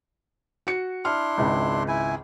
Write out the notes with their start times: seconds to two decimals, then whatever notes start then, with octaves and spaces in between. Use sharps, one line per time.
0.67 F#4 C#7
1.05 D4 E4 C6 F6
1.37 G#1 C#2
1.88 E4 G#5